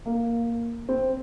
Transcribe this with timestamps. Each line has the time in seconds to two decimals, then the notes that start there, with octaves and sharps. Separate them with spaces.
0.06 A#3
0.89 C4